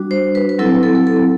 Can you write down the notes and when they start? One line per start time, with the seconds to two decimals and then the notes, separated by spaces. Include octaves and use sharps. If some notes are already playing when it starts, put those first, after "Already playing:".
Already playing: G3 D4 F#4
0.11 C5
0.35 B4
0.49 B4
0.59 F#3 C4 E4 A4
0.83 A4
0.95 A4
1.07 A4